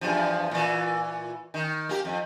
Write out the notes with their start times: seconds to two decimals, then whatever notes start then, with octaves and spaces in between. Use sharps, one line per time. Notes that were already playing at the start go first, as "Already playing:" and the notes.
0.01 E2 G2 F3
0.51 A#2 E3
1.54 D#3
1.89 A#3 G4
2.05 F2